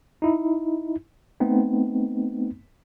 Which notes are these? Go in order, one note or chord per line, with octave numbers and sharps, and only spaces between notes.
D#4 E4
A3 B3 C4 D#4